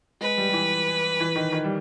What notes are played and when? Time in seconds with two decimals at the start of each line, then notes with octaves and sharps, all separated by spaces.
0.21 G#3 B4
0.37 G3
0.49 G3
0.53 E3
1.20 E3
1.36 D#3
1.52 D#3
1.64 G3